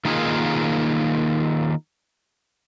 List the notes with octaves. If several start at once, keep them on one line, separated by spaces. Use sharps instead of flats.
D#3 A#3 D#4 F4 G#4